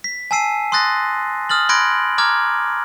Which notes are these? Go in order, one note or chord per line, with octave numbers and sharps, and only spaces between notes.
B6
G#5 A5 E6 C7 D#7
C6 D#6 F#6 A6 A#6
D#6 F6 A6 F#7
B5 C6 F#6 G#6 A#6 D7
A#5 D6 F6 G#6